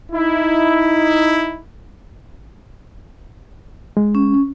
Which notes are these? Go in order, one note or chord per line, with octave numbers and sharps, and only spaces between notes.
D#4 E4
G#3
C#4